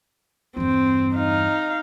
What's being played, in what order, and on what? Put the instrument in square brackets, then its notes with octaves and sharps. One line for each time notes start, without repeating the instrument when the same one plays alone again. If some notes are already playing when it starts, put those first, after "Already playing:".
[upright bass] E2 G2 [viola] C4
[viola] D#4 F5